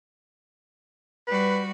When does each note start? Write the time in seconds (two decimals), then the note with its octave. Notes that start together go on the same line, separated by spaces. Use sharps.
1.28 G3 F#4 B4